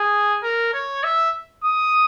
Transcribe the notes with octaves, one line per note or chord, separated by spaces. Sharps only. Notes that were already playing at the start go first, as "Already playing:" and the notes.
Already playing: G#4
A#4
C#5
E5
D#6